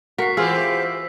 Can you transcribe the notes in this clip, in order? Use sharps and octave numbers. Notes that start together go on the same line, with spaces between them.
F#4 A#4 B6 C7
E3 C4 F4 G4 G#4 E6